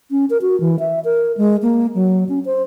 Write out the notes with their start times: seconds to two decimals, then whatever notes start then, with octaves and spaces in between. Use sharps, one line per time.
0.11 C#4
0.30 A#4
0.41 F#4
0.60 E3
0.79 E5
1.05 A#4
1.37 G#3
1.62 A#3
1.95 F#3
2.29 C#4
2.46 C5